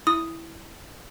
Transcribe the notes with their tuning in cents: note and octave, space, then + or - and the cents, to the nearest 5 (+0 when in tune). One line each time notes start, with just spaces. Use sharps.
E4 +0 D#6 +0